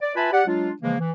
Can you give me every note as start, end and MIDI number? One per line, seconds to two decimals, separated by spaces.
0.02 0.12 74
0.16 0.30 65
0.16 0.30 71
0.16 0.30 76
0.16 0.30 80
0.16 0.30 81
0.16 0.30 83
0.33 0.43 67
0.33 0.43 74
0.33 0.43 78
0.47 0.71 54
0.47 0.71 56
0.47 0.71 62
0.47 0.71 65
0.82 0.95 49
0.82 0.95 52
0.82 0.95 53
0.82 0.95 56
0.82 0.95 58
1.00 1.11 52